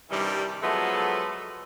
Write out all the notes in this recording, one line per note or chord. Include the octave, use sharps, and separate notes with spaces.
G2 C3 D#3 E3 G3
F3 F#3 G#3 A3 B3 A4